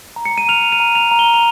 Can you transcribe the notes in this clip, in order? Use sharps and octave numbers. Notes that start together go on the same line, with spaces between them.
A#5
C#7
D#7
F6 F7
D#7
A#5
F7
A#5
G7
F7